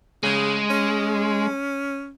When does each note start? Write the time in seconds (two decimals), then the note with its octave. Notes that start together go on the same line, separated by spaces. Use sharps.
0.23 C#3 G#3
0.70 C#4